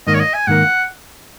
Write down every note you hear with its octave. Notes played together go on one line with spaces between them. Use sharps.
G#2 D#3 A#3 D#5
C#5
D#5
G#5
G#2 D#3 A#3 F#5